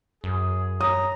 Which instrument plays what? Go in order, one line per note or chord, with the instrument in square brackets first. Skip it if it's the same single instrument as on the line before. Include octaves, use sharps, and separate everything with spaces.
[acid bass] F#2 [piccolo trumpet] G#4
[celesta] C#5 [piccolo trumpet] A#5 [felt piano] D#6